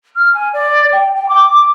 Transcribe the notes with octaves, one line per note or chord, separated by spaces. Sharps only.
F6
G#5
D5
G5
G5
D6